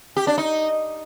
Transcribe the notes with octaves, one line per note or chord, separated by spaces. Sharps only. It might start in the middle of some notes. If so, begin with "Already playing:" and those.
G4
D4
D#4